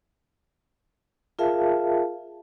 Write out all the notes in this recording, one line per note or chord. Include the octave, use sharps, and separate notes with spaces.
F4 G#4 A#4 E5 F5 A5